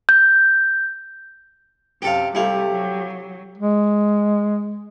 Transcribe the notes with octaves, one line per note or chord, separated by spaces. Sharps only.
G6
F#2 C3 G4 A4 F5
C3 G3 A3 E4 G4 F5
F#3
G#3